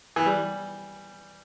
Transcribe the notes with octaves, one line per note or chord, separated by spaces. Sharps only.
E3
G3